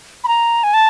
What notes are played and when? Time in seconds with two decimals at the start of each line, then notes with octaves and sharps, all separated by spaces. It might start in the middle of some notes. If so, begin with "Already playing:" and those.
0.24 B5
0.28 A#5
0.63 G#5
0.74 A5